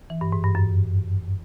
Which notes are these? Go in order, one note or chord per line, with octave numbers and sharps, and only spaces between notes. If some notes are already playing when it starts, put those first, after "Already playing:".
E3
G2
G#2
G2
F#2